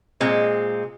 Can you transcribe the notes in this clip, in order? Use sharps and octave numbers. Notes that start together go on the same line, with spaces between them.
A#2 G#3 C4